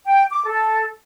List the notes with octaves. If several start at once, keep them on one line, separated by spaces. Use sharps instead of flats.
G5
D6
A4